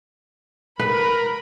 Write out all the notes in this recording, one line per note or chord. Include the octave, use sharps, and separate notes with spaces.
A#4 B4 B5